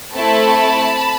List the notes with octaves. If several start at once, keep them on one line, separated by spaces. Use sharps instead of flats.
A3 C4 E4 A4 A5 B5